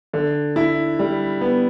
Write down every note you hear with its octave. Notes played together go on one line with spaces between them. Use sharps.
D3
E4
G3
B3